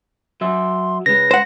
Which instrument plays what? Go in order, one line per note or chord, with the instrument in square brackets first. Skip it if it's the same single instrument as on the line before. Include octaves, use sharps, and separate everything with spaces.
[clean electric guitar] F#3 E5 [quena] C6
[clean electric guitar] C#3 G#3 [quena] B4 [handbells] A#6
[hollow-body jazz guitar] C5 F#5